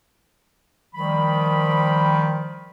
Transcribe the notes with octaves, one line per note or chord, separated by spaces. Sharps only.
D#3 F3 G3 B5